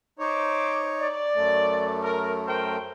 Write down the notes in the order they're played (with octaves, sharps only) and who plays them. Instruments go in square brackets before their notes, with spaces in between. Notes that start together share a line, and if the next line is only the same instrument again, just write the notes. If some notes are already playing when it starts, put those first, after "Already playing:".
[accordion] D#4 C#5 [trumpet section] C5 D6
[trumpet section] D5
[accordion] F#2 A3
[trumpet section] A#4
A#4 C5 G5